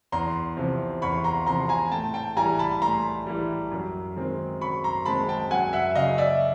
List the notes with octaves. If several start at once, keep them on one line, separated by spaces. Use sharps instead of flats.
E2 A#5 C6
C3 F3
E2 B5 C#6
A#5 C6
C3 F3 A#5 C6
G#5 A#5
A2 G5 A5
G5 A5
E3 G3 G#5 A#5
A5 B5
A2 A#5 C6
E3 G3
F#2
D#3 G#3 C4
F#2 B5 C#6
A#5 C6
D#3 G#3 C4 A5 B5
G5 A5
F#2 F#5 G#5
E5 F#5
C#3 F#3 D#5 F5
D5 E5